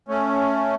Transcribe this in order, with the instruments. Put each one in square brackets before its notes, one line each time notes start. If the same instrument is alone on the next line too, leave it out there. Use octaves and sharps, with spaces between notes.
[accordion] A3 C#4